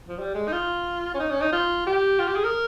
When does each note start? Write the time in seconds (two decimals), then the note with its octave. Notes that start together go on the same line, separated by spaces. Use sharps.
0.08 F3
0.19 G3
0.35 G#3
0.47 D#4
0.52 F4
1.15 C#4
1.19 D#4
1.31 C#4
1.41 D#4
1.52 F4
1.87 G4
2.20 F4
2.28 G4
2.36 G#4
2.44 A#4